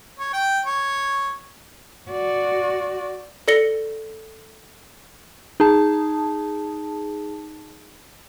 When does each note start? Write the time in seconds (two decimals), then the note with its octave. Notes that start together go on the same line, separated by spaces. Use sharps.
0.19 C#5
0.33 G5
0.66 C#5
2.10 F#4 D5
3.48 A4 D5 A#6 C#7 G7
5.60 D#4 G#4 A5